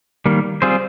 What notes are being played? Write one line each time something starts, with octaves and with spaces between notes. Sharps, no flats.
D#3 G3 A#3
G3 C4 F4 G#4 C5